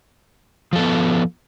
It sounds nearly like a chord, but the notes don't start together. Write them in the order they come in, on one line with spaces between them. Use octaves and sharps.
F3 A4 B3